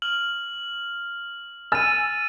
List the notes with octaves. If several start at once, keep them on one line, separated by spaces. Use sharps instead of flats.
F6 F#7
G#5 E6 A6 D#7